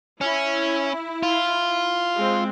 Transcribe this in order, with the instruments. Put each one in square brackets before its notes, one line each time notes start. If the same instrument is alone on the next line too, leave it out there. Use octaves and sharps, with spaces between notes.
[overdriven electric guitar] C#4 [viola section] E4
[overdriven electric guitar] F4
[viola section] G#3 C4